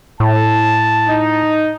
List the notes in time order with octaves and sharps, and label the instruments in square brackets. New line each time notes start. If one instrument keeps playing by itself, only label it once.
[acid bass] A2 [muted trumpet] A5
[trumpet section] D#4